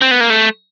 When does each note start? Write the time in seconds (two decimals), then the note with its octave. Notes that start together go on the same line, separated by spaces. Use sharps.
0.01 C4
0.11 B3
0.20 A#3
0.30 A3